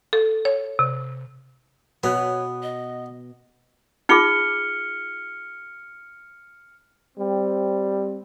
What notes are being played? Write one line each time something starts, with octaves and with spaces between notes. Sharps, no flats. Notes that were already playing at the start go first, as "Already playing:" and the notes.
A4
C#5
C3
B2 B3 B4 C#5
D#5
D#4 F4 G#4 F6 C#7 G7
G3 C4